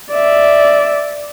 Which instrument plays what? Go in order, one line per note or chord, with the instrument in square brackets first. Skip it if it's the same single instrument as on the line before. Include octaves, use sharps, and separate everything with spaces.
[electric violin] D5 E5